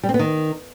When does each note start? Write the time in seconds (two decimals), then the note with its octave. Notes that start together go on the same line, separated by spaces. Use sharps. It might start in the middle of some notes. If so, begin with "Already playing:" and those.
0.03 G3
0.09 C4
0.14 B3
0.19 D#3